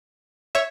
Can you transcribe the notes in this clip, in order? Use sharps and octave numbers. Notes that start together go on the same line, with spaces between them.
C#5 E5